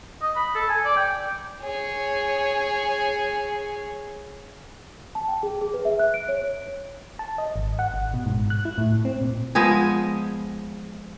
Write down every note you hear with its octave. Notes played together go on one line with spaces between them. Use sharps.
D#5
B5
A4
G#5
D5
G5
G#4 C#5
A5
G5
G#4
G#4
B4
E5
F#6
D7
C#5
A5
D#5
G#1
F#5
G#1
B2
G#2
F#6
E4
A2
C4
A#2
F3 G#3 B3 G#4